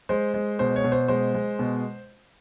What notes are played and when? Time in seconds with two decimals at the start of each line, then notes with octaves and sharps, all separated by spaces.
0.09 G#3 C5
0.34 G#3
0.59 B2 C5
0.76 C#5
0.84 B2
0.92 C5
1.08 G#3 C5
1.34 G#3
1.59 B2